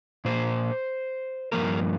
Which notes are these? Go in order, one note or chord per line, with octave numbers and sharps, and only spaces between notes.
A#2 A#3 C5
G2 F3 A#3 A#4